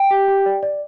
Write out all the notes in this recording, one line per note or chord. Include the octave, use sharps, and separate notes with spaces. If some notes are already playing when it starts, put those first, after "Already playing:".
Already playing: G5
G4
G4
D5
D5